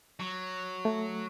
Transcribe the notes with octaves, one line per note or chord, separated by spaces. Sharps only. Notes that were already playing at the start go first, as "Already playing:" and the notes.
F#3
A3